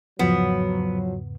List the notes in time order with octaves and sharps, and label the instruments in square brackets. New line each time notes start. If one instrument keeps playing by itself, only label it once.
[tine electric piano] E2 G#2 C#3 [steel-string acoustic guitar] F3 [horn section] F#3 [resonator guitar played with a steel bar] B3